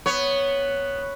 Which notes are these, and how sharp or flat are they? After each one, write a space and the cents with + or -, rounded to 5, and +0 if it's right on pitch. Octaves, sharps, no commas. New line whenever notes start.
B3 +0 C#5 +0